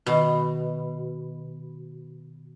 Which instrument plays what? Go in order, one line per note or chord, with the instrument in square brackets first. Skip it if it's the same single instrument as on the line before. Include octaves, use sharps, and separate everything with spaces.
[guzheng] B2 [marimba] D#3